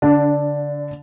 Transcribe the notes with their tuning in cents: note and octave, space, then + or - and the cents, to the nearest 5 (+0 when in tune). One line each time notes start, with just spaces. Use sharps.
D3 -30 D4 +0